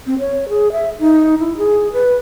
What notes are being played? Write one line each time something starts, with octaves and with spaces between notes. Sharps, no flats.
C4
C#5
G#4
E5
D#4
E4
G#4
B4